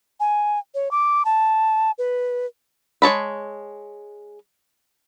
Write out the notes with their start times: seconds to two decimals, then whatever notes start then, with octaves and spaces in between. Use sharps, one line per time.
0.20 G#5
0.75 C#5
0.91 D6
1.25 A5
1.98 B4
3.02 G#3 C#5 A5 B5